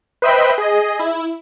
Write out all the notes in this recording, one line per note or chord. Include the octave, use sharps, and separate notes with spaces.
B4 C5 D#5 E5 G5 B5
G#4 D#5
E4